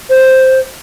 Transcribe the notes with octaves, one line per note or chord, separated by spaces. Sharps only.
C5